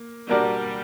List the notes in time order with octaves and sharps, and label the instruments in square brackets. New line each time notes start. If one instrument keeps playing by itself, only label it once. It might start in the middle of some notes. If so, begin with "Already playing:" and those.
Already playing: [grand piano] A#3
[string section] G3 [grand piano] A#3 D4 F#4 A#4 D5